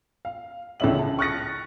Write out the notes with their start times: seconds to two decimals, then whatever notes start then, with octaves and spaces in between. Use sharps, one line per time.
0.25 F5
0.80 C#2 D3 E3 C#4 E5 F#7
0.99 A5
1.19 C#6 F6 F#6 A6 A#6 C#7